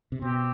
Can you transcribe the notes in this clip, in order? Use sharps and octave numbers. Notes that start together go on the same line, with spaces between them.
C3
B2 C4 G4